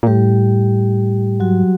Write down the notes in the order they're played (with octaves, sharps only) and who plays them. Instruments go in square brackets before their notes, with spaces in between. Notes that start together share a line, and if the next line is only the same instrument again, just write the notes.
[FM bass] A#2
[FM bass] A2 [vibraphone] G3 G4
[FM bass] G#2 [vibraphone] F#3 F#4